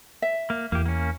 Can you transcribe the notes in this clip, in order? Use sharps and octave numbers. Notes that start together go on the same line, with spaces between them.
E5
A#3
E2 A#3 G4
A#3 C#4